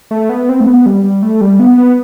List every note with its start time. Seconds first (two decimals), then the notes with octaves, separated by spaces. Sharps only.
0.11 A3
0.29 B3
0.49 C4
0.61 A3
0.67 B3
0.86 G3
1.04 G3
1.23 A3
1.41 G3
1.60 B3
1.78 B3